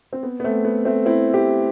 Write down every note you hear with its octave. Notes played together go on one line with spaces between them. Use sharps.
C4
B3
B3
A3 C4
B3
A3 C4
C4 E4
E4 G4